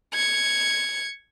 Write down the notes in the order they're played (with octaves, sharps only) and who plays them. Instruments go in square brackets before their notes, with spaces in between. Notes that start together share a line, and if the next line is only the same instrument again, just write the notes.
[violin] G#6 C#7